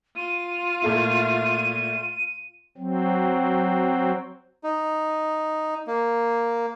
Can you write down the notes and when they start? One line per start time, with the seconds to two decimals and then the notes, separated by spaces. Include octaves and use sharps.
0.16 F4 D#7
0.82 A#2 A3 E4
2.78 F#3 C4
4.64 D#4
5.87 A#3